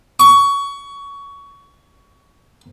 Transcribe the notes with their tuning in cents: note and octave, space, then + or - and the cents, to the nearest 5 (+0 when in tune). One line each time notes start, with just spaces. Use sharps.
C#6 +20